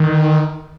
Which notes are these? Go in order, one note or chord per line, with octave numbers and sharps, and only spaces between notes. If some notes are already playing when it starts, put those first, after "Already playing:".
Already playing: D#3